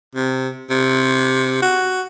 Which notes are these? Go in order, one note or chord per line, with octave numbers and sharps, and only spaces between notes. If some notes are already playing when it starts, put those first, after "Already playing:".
C3
C3
F#4